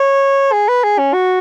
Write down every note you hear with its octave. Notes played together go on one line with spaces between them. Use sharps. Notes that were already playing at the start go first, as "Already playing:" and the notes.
Already playing: C#5
G#4
B4
G#4
C#4
F#4